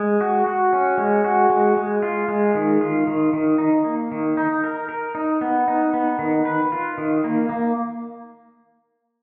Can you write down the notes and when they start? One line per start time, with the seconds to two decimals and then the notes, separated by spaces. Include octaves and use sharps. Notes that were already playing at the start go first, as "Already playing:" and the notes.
Already playing: G#3
0.21 F#4
0.46 F#4
0.73 C#4
0.98 G#3
1.24 F#4
1.50 G#3
1.77 G#3
2.02 F4
2.28 G#3
2.55 D#3
2.81 F4
3.07 D#3
3.33 D#3
3.58 D#4
3.84 A#3
4.12 D#3
4.37 D#4
4.64 A#4
4.89 A#4
5.15 D#4
5.41 B3
5.68 D#4
5.93 B3
6.19 D#3
6.45 B4
6.72 F4
6.98 D#3
7.24 A#3
7.49 A#3